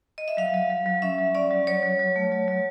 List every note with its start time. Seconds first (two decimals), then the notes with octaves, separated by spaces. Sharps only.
0.18 D#5
0.28 E5
0.37 F#3 F5
0.54 F#3
0.70 F#3
0.86 F#3
1.02 C#4 E5
1.18 F#3
1.35 C#4 D5
1.51 F#3
1.67 F#3 C#5
1.83 F#3
1.99 F#3
2.16 A3
2.32 F#3
2.48 F#3